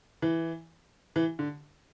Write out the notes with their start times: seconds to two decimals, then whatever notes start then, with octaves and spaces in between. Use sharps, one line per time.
0.22 E3
1.16 E3
1.39 D3